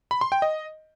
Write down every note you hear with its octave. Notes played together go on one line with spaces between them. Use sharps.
B5
C6
G5
D#5